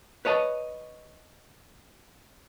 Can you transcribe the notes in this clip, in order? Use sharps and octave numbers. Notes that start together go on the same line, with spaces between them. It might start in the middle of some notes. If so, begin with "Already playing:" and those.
B4 C#5 D#5 A5